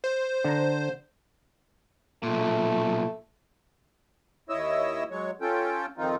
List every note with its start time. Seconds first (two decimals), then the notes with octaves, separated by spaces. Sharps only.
0.04 C5
0.44 D3 A#5
2.23 B1 A#2 A3
4.49 D#2 E4 C#5 D#5 E6
5.11 F#3 G#3 C#5
5.41 C#4 F4 A4 G5
5.98 F2 D#3 C4 D#4 F4